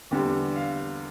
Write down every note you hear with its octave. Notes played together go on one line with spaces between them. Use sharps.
E2 D3 G3 G4
F5